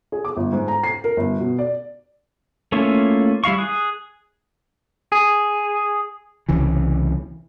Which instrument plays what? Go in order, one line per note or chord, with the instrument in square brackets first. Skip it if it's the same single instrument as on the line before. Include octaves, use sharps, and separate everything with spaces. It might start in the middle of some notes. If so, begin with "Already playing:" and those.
[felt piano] G#4
D6
G1
G#2
A#5
C7
A#4
G1
B2
D5
[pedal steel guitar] A3 A#3 C#4 E4 F4
G3 E4 F5 C#6
G#4 D#6 F#6
G#4
[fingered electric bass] C2 C#3 E3